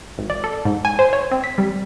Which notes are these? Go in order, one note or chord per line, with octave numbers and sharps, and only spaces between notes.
G#1
D5
A4
G#2
G#5
C5
C#5
C4
B6
G3